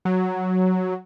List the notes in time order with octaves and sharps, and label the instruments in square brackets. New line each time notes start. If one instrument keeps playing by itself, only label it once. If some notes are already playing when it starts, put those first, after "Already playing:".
[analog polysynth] F#3